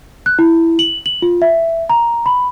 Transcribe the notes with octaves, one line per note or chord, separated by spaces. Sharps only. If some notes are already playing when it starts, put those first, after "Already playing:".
F#6
E4
F#7
F#7
F4
E5
A#5
B5